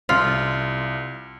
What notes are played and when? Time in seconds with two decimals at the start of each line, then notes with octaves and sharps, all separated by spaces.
0.09 C2 F4